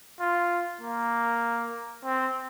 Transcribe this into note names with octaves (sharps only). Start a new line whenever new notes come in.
F4
A#3
C4